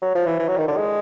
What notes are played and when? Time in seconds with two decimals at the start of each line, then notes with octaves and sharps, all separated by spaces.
0.02 F#3
0.15 F3
0.27 E3
0.40 E3
0.48 F#3
0.58 D#3
0.68 D3
0.77 G#3